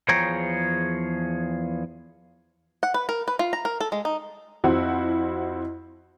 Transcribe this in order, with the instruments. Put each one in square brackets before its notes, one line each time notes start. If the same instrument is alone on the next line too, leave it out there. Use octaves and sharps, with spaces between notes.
[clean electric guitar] E2 F3 G#4 C#5 G5 A#5
[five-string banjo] F#5
B4
A#4
B4
F4
A#5
A#4
A4
G#3
D#4
[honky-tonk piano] F2 C4 E4 F#4 F#5